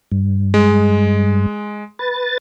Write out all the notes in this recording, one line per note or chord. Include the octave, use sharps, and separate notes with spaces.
G2
G#3
B4 A6